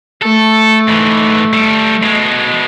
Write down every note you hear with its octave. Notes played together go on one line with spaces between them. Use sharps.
A3 A4
G#2 E3
G3 A4
B2 G#3